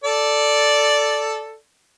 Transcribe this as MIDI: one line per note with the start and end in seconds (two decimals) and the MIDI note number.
0.04 1.57 69
0.04 1.57 74